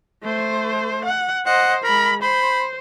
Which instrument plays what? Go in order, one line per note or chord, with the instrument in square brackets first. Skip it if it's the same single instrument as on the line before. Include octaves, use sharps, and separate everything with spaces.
[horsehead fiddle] A3 C5
F#5
[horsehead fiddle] C5 D#5 [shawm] F#5
[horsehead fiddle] G#3 B5 [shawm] A#4
[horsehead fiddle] C5 [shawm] B5